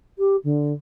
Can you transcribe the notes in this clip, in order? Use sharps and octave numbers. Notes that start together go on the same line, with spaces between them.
G4
D3